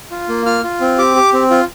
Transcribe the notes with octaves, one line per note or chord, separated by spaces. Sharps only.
F4
A#3
F4 F6
F4
C4
G4 D6
G4
C4
F4